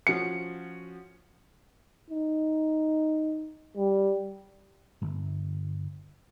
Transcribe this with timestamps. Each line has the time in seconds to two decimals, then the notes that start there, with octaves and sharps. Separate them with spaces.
0.07 F3 C#4 F#4 C#7
2.10 D#4
3.77 G3
5.02 G1